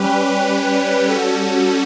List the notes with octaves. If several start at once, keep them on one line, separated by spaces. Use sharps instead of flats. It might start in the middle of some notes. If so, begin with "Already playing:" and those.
Already playing: G3 C#4 G4 B4
G3 C#4 F#4 A4